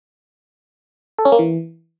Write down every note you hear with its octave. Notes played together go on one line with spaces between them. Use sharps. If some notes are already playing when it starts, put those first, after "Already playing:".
A4
C#4
A#3
E3